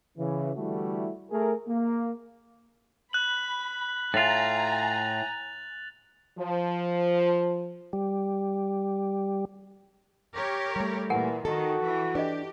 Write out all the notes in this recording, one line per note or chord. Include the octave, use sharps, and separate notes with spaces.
C#3 E3
D3 E3 G3 A3 E4 F#4
A3 G#4 A#4
A#3
B5 F#6 F#7
A2 F4 G#5 A#5 A6 F7
F3
G3
G4 A#4 C#5
G3 A3
A#2 E3 A#4 F#5 G#5
D#3 F#4 A4
E3
D4 G4 B4 D#5